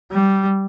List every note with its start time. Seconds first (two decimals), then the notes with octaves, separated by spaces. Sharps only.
0.12 G3